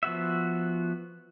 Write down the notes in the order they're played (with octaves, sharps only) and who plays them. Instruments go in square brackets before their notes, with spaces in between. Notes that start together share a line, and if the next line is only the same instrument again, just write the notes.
[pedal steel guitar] F3 B3 F#4 E5